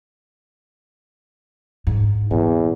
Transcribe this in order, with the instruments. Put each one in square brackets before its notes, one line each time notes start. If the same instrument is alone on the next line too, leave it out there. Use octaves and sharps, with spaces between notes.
[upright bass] G#2
[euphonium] E2 [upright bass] A#2